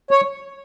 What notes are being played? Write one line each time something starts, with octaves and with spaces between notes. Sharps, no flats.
C#5